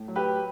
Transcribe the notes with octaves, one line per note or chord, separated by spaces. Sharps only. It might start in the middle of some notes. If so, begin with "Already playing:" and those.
Already playing: A2
F#3
G4 B4